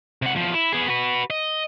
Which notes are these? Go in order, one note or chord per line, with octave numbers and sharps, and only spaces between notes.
C3 F#5
E2 F3
E4
B3 G#4
F#4 B4
D#5